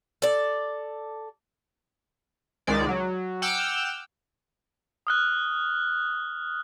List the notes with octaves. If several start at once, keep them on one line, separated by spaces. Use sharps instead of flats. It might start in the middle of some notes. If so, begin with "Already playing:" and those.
A4 D5
C#2 D#3 G#3 D5
F#3
F#5 G5 D6 E6 F6 G6
D#6 F6 F#6